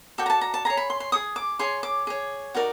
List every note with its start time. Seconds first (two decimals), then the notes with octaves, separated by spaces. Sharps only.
0.18 F#4 A4 D5 G5
0.26 A#5
0.30 A5
0.41 A#5
0.54 A5
0.65 G#4 C#5 A#5
0.77 B5
0.90 C6
1.00 C6
1.12 G#4 C#5 D#6
1.36 D6
1.59 G#4 C#5 C6
1.83 D6
2.07 G#4 C#5
2.54 D#4 F#4 A#4 D5